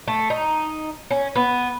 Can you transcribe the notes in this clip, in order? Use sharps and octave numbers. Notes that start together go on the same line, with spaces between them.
A3
D#4
C#4
B3